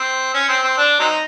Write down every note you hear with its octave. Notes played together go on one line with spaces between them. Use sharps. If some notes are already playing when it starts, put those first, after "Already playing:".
Already playing: C4
C#4
C4
C4
D4
F#3 C4 D#4